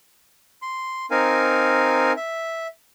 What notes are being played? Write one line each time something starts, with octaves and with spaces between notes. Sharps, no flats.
C6
C4 D#4 A#4 F5 G#5
E5